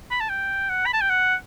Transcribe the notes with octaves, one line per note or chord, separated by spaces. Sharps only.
B5
A5
G5
F#5
B5
A5
G5
F#5